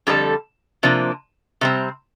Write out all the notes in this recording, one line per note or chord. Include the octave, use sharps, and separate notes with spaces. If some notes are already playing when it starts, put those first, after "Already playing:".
F2 D3 G3 D4 A4
C3 F3 A#3 D4
C3 G3 C4